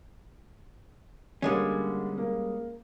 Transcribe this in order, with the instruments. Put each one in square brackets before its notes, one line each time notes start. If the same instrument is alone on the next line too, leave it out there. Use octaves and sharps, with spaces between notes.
[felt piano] D3 A#3 [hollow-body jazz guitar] G3 G#3 C#4
[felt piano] A#3